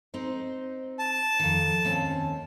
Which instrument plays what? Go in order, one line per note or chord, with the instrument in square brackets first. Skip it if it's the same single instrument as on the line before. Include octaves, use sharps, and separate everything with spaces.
[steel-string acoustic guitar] C4 D#4 C5
[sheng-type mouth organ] A5
[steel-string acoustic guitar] F2 D#3
D#2 C4 C#4